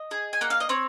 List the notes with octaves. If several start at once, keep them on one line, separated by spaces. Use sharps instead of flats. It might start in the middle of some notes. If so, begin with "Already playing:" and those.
Already playing: D#5
G#4
G#5
A#3 F#5
F5
D#5
C4 C#5